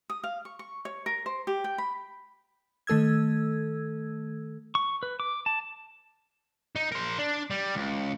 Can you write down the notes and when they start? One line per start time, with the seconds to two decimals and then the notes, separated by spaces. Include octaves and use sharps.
0.10 D#6
0.24 F5
0.45 C#6
0.59 C#6
0.85 C#5
1.06 A#4
1.26 C5
1.47 G4
1.64 G5
1.78 B5
2.87 D#3 A3 A4 E6 G#6
4.75 C#6
5.03 B4
5.20 D6
5.46 A5
6.76 D#4
6.92 A#4 C5
7.19 D4
7.50 G3
7.75 C#2